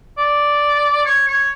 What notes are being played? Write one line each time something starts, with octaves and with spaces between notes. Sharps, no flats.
D5
C#5
C#5